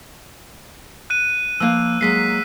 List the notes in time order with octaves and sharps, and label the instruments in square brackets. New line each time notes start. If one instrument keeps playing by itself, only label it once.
[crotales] F#6 D#7
[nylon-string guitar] F3 A#3 F5 [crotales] E6 F#6
[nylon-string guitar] F#3 G#3 A#3 [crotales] B6 C7